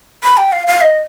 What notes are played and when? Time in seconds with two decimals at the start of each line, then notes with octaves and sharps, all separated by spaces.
0.24 B5
0.37 G5
0.52 F5
0.67 F5
0.81 D#5